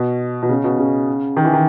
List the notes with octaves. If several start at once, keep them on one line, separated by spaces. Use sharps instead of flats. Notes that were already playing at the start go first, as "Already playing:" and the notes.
Already playing: B2
B2
C#3
B2
C#3
D#3
E3
D#3